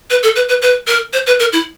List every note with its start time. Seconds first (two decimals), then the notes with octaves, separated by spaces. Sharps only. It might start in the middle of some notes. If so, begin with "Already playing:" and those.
0.10 B4
0.23 A4
0.36 B4
0.49 B4
0.62 B4
0.87 A#4
1.13 C5
1.27 B4
1.40 A#4
1.52 E4